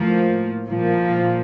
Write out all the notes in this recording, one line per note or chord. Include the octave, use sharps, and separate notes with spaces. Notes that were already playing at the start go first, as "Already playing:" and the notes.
Already playing: A2 F3 A#3
A#2 F3 A#3